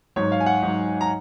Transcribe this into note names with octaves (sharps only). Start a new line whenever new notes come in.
G#2 F#3 C#5
F5
G#5
F#5
G#2 F#3
A#5